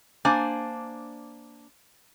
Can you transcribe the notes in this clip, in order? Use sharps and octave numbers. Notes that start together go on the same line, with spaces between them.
A#3 D4 C5 G#5